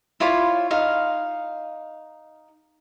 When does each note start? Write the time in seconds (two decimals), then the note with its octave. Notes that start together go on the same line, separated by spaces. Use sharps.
0.20 E4 F4 C#5 D5
0.71 D#4 F5